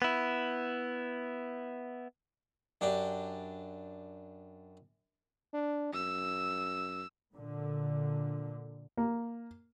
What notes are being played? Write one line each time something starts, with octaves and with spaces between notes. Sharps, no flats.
B3 E4
F#2 D4 G4
D4
F#2 E6
A#2 D3
A#3